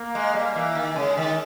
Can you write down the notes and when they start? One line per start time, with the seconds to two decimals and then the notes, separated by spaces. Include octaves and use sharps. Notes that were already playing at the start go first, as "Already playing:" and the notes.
Already playing: A#3
0.15 G#3
0.34 G3
0.56 E3
0.75 D#3
0.96 C#3 G#3
1.17 D#3